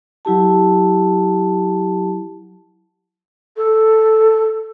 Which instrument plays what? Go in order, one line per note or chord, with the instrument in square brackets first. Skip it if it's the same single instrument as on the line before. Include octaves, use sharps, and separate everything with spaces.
[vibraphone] F#3 E4 G4 A5
[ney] A4